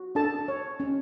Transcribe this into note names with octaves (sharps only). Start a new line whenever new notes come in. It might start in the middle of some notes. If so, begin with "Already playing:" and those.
Already playing: F#4
D4 A4 A5
C#5
C#4